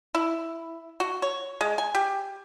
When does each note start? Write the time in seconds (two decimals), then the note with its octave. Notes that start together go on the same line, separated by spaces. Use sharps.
0.15 E4
1.00 F#4
1.22 C#5
1.61 G#3
1.78 G#5
1.95 G4